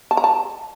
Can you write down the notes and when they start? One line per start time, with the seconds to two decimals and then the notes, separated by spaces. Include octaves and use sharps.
0.11 A5
0.17 A#5
0.24 A5